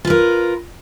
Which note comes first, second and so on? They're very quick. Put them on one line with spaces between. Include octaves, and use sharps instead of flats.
F4 B4 A#4